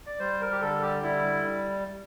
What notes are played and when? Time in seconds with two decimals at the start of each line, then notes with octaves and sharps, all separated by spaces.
0.07 D5
0.20 G3 C5
0.41 A#4
0.52 G4
0.61 D3 A4
0.82 G4
1.03 G3 E4